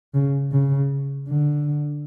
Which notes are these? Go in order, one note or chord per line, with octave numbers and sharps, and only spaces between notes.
C#3
C#3
D3